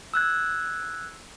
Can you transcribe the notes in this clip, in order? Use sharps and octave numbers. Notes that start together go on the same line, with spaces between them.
E6 F#6 G#6